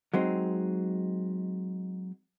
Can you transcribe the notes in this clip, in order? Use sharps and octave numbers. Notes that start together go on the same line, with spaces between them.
F#3 G#3 C4 D#4